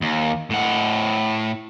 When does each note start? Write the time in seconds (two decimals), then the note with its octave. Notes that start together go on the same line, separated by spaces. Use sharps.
0.01 D#2
0.50 A2 F#5